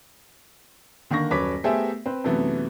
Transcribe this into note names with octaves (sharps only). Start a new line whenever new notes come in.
D3 D#3 A#3 C#6 A#6
D#1 F#2 B4 C#5 D6 B6
A3 B3 G4 G#4 C5 E5
C4 B4
F#2 C3 E3 A3 B3